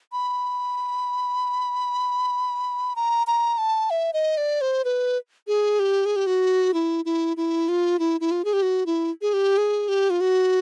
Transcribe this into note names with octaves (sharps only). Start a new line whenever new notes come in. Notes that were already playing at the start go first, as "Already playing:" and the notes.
B5
A#5
A#5
A5
E5
D#5
D5
C5
B4
G#4
G4
G#4
G4
F#4
E4
E4
E4
F4
E4
E4
F4
G#4
G4
F#4
E4
G#4
G4
G#4
G4
F4
F#4